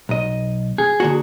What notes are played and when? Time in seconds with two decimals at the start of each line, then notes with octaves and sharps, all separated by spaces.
0.09 B1 D#5
0.78 G#4
1.00 D3 A#3 F#4